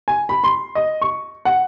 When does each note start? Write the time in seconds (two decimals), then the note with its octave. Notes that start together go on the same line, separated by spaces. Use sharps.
0.08 G#5
0.29 B5
0.44 C6
0.75 D#5
1.02 C#6
1.45 F#5